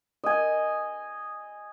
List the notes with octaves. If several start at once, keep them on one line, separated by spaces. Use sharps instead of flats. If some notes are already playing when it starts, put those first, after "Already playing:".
D#5 G#5